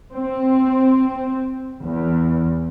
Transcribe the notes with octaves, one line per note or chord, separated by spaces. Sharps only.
C4
E2